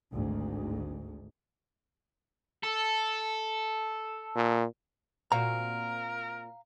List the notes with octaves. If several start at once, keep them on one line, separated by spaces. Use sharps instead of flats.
G#1 D2 G#2
A4
A#2
A#2 C4 F#4 A#4 F5 A#5